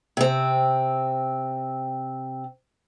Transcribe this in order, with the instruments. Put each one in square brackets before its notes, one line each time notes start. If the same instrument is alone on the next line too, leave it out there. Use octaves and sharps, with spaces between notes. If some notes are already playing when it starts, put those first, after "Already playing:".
[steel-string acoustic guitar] C3 C4